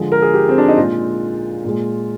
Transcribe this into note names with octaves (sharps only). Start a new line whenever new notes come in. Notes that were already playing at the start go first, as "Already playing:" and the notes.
Already playing: D3 F3 G#3
A#4
G#4
G4
C4
D4
D#4
A#2 G#3 F4
A#2 G#3